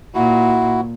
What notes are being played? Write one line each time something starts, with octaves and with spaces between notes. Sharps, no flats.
A#2 E4 F#4